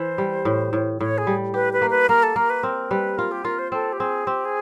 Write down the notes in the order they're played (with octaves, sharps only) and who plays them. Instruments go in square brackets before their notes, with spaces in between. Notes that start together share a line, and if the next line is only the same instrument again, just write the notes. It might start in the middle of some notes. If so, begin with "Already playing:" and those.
Already playing: [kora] E3 [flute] C5
[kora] G3
A2
A2
[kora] A2 [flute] C#5
[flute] G#4
[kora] G3
[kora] G4 [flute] B4
[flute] B4
[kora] A#3
[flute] B4
[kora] A#3 [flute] A#4
[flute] A4
[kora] A#3 [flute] A#4
[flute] B4
[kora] C4 [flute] A#4
[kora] G3 [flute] B4
[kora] F4 [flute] A#4
[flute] G4
[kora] F4 [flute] A#4
[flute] C5
[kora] C4 [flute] A4
[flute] G4
[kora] C4 [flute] G#4
[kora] C4 [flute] G4
[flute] G#4